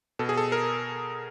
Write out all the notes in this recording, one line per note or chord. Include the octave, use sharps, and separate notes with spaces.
B2 A4
G#4
A4
A#4